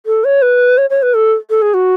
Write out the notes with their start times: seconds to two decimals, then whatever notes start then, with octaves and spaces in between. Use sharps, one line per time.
0.06 A4
0.24 C#5
0.42 B4
0.78 C#5
0.90 C#5
1.02 B4
1.14 A4
1.50 A4
1.62 G#4
1.74 F#4